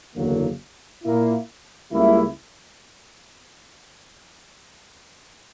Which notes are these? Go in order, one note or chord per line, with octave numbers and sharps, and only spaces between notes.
F#1 E2 D3 F#3 A#3
A#2 A#3 E4
C#2 C#3 G3 A#3 E4